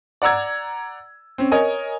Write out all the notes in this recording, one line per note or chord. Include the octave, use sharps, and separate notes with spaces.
D5 F#5 A#5 E6 G#6
C4 C#4
A#4 C#5 D#5 G#5